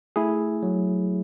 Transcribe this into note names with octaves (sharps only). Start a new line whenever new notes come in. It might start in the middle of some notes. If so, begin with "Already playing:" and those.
A3 E4 G#4
F#3